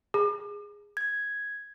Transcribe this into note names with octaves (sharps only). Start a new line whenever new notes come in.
G#4
G#6